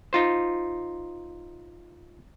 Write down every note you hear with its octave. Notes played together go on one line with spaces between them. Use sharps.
D#4 F4 C5